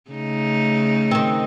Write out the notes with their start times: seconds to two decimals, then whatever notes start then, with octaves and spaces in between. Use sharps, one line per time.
0.11 C#3 A3 D#4
1.11 D#3 C4